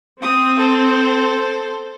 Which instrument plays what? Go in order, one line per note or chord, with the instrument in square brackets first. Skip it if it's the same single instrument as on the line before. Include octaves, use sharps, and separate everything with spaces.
[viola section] C4 [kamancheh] D#6
[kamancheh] A4 C5